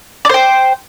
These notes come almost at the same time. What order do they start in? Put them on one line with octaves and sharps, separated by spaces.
D5 C5 G5